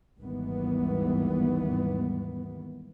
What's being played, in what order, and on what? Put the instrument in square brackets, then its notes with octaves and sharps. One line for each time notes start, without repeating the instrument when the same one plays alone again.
[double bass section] G#1 D#2 D#3 E3 G3 B3